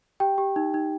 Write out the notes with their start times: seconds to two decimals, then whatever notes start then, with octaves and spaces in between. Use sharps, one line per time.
0.20 G4 G5
0.38 G4
0.56 D#4
0.74 D#4